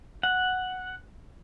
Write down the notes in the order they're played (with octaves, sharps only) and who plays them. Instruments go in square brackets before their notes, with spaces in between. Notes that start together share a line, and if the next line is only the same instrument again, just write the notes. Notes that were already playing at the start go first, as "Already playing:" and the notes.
[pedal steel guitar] F#5